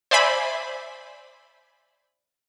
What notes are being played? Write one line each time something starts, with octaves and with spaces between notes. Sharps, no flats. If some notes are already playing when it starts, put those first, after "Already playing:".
C5 D5 E5 G#5 B5